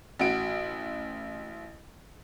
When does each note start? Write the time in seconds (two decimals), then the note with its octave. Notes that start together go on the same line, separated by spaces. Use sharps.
0.19 A1 F#4 D7